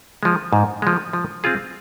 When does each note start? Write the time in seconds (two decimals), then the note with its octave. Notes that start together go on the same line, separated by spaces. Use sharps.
0.23 F3 G#3
0.53 G#2
0.82 F3 G#3
1.13 F3
1.44 C4 F4 G#4